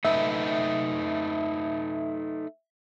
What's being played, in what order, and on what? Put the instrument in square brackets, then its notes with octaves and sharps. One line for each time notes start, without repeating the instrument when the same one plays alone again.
[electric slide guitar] A3 D#4 B4 [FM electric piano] E5